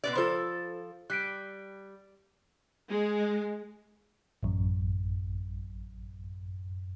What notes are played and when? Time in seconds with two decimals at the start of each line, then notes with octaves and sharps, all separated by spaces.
0.04 B2 B4 D5
0.15 F3 F4 A4 C5 B5
1.10 G3 F#6 B6 D7
2.89 G#3
4.43 A1 F#2